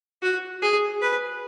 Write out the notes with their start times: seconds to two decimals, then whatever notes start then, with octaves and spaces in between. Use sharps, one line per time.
0.22 F#4
0.62 G#4
1.02 B4